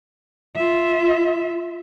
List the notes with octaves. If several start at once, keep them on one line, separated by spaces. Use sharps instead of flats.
F4 E5